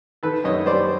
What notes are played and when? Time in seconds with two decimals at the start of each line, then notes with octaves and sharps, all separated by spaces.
0.23 D#3 A4 B4
0.44 F#2 C#5 D#5
0.66 G3 C5 D5